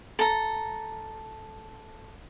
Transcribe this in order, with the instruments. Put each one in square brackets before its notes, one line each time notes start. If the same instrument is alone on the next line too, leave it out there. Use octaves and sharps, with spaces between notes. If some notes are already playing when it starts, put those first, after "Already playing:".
[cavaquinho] A4 A#5